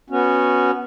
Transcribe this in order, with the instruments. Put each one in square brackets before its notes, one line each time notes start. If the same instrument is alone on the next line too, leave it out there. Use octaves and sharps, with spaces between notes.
[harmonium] B3 C#4 F#4